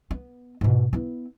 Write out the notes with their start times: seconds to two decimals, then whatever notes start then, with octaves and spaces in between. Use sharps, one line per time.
0.11 B3
0.61 G#2 B2
0.93 B3 E4